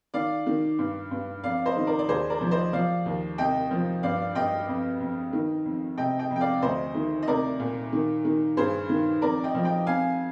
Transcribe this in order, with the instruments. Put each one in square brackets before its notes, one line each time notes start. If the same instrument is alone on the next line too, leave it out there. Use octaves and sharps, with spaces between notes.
[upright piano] D#3 D5 F5
D#3
G2
G2
F2 D5 F5
C5 D#5
D#3
A#4 D5
D5
D#2 G#4 C5
A#4 D5
F3
C5 D#5
F3 D5 F5
D#2
C2 D#5 G5
F3
G2 D5 F5
G2 D#5 G5
F2
F2
D#3
F2
C3 D#5 G5
D#5 G5
F2
G5
D5 F5
D2 C5 D#5
D#3
D#5
C2 A#4 D5
A#2
D#3
D#3
G2 G#4 C5
D#3
F2 A#4 D5
D#5 G5
F3
D#5 G5
F2 F5 G#5